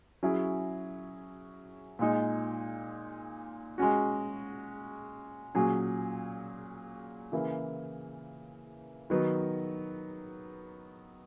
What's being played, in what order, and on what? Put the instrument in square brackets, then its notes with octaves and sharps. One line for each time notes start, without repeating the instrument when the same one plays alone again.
[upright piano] F#3 C#4 E4 G#4
A#2 G#3 D#4
G#3 C#4 F#4
A#2 F#3 C#4 G#4
C#3 E3 A#3 E4
D#3 F#3 B3